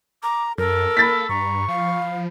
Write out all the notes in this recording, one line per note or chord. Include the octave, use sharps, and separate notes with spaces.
A#5 D6
F#2 A4 A#4
A#3 B5 A6 B6
G2 A#5 C#6
F3 F5